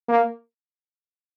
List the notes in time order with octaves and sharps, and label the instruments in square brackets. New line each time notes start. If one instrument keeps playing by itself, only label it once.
[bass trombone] A#3